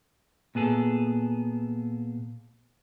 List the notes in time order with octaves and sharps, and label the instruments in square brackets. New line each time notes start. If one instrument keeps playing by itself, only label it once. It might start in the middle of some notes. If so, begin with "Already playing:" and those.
[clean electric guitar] A#2 B3 G#4 A4